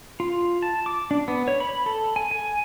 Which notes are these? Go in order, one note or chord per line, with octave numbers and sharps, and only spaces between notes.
F4
A5
D6
D4
B3
C#5
B5
A4
G#5
G#5